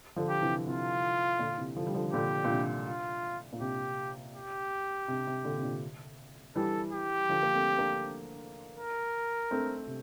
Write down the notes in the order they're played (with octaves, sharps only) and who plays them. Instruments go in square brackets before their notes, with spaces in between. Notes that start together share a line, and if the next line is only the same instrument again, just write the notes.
[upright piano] D3 F3
[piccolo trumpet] G4
[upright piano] C3 E3
[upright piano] C3 E3 [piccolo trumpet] F4
[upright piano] A#2 D3
C3 E3
D3 F3
G3
D3 F3
[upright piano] A#2 D3 [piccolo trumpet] G4
[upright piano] A#2
C3
[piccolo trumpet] F4
[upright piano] A#2
[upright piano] C3 [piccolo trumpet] G4
[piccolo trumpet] G4
[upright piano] C3
C3
A#2 D3
C3
A#2 D3
[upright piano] E3 G3 [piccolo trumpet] A4
[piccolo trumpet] G4
[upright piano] D3 F3
A#3
A3 C4
A#3 D4
[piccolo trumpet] A#4
[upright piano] A3 C4
C3